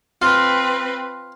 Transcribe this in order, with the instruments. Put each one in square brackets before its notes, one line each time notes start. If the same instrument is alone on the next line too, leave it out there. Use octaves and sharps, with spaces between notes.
[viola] C4 B4 [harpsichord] F4